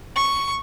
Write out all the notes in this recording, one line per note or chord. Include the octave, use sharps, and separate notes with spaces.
C#6